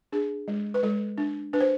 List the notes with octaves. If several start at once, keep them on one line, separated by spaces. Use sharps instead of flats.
D4 G#4
G#3
B4
G#3 A4
D4
D4 B4
C5